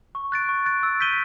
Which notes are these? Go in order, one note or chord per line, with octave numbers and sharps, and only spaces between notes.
C#6
F#6 A6 D7
C#6
F#6 A6 D7
E6
G6 B6 D#7 G7